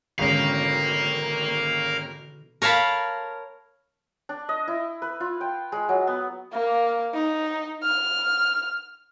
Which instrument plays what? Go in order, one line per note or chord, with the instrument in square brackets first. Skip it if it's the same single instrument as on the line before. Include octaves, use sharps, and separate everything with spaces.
[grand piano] G#1 G#3 C#4 [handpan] B2 D3 E3 [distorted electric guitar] A#4 F5
[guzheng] A#4 C#5 F5 A5 B5
[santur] D4
D#5
E4
B4
F4
G5
G#3
F#3
B3
[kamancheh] A#3
D#4
F6